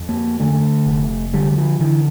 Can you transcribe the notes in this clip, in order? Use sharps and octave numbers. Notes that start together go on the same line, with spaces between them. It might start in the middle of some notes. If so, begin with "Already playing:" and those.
Already playing: F2
A#3
D3 A3
F1
D3 G3
G3
F3
D3 E3